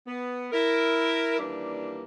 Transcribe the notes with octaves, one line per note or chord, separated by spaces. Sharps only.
B3
E4 A#4
D#2 E3 G3 A#3 D4